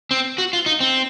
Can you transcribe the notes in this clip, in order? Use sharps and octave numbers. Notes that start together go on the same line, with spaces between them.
C4
F#4
F4
D#4
C4